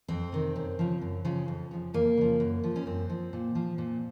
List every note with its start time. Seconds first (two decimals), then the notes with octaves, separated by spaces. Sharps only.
0.08 F2 C4
0.32 C3 D#3
0.56 F#2
0.79 C#3 F3
1.01 F#2
1.25 C#3 F3
1.48 F2
1.71 C#3 F3
1.94 F2 A#3
2.17 C#3 F3
2.40 F#2
2.64 F3
2.76 C#4
2.86 F#2 C4
3.10 F3
3.33 A#2
3.55 F3
3.78 A#2